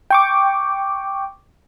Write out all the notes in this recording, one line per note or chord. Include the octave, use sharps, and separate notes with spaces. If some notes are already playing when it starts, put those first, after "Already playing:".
G5 C#6 D6